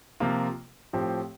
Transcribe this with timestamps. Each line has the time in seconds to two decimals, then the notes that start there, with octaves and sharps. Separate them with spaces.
0.20 C3 F3 A#3 F4
0.93 A2 F3 C4 G4